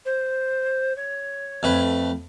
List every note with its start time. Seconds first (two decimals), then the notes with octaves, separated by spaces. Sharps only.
0.05 C5
0.96 C#5
1.63 F2 A3 B4